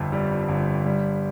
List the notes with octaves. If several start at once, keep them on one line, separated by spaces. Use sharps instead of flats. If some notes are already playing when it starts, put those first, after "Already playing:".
Already playing: G1 F2
G3
G1
G3